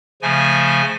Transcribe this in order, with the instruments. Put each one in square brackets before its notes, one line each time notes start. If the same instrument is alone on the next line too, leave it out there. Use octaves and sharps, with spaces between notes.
[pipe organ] C#3 F3 A3 G#5